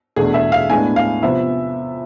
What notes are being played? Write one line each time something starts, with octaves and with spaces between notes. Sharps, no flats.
E2 B2 A3 D4 G#4
E5
F5
A2 G#3 B3 D4 G#5
F5
C3 F3 B3 E5